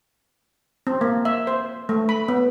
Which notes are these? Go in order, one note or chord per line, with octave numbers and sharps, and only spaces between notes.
C4
A#3
E5
C5
A3
B5
B3